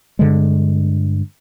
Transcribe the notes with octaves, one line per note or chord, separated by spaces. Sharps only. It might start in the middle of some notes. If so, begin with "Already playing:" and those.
G2 D3 G#3